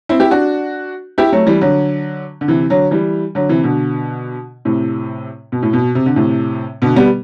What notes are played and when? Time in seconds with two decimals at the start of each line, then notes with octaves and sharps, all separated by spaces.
0.09 C4 E4
0.20 E4 G4
0.31 D4 F#4
1.18 E4 G4
1.32 F#3 A3
1.46 E3 G3
1.61 D3 F#3
2.41 D3
2.48 C3 E3
2.70 D3 F#3
2.91 E3 G3
3.35 D3 F#3
3.49 C3 E3
3.63 B2 D3
4.65 A2 C3
5.52 B2
5.62 A2
5.73 B2
5.95 C3
6.06 D3
6.16 A2 C3
6.82 B2 D3
6.96 G3 B3